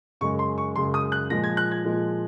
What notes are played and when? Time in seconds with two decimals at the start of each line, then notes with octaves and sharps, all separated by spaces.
0.21 F#2 C#3 G#3 C#6
0.39 C6
0.58 C#6
0.76 F#2 C#3 G#3 C6
0.94 D#6
1.12 F#6
1.30 A#2 F3 G#3 A#6
1.44 G#6
1.57 F#6
1.72 G#6
1.85 A#2 F3 G#3